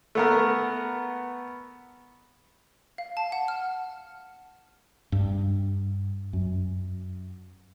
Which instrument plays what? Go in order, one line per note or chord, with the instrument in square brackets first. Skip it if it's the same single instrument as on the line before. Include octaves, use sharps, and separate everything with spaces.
[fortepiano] A3 B3 A#4
[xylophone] F5
A5
F#5
F6
[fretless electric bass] G2
F#2